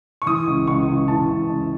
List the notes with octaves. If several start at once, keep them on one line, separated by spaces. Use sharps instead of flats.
C#6
E3 D#6
C#2
C#2 C#6
C#2
E3 A5
C#2
C#2